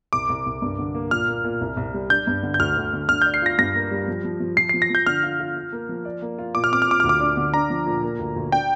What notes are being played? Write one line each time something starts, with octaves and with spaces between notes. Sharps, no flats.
C2 D6
C2
C2
G2
D3
A#3
A#2 F6
A#3
A#2
C2
C2
G3
D4 G6
G2
D3
G6
D2 F6
D2
D3
D3 F6
D5 G6
C7
F4 A#6
G2 A#6
A#3
G3
F3
F3
F3
F3 C7
F3 C7
A#6
F3 G6
D3 F6
F4
F4
F4
A#3
F3
D5
A#3
F4
A#2 D6
F6
C4 D6
F6
A#2 D6
D2 F6
D6
D4
D3
D4 A#5
F3
A#2
A#3
D2
D2
D4 G5